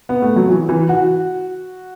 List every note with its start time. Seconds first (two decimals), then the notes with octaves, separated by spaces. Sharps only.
0.09 B3
0.22 A3
0.36 F#3
0.50 E3
0.69 E3
0.89 F#4